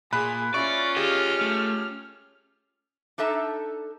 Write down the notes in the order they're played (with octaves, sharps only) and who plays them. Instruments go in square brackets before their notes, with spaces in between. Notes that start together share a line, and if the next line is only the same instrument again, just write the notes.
[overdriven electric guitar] A#2 [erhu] G#4 [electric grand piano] B5 F#6
[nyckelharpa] C#4 F4 [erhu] E4 [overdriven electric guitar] D5 [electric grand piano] C#6
[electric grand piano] G4 G#4 [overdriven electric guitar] D#5 F5 [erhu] F6
[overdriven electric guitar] A3
[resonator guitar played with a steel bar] D4 D#4 A4 E5 A5 A#5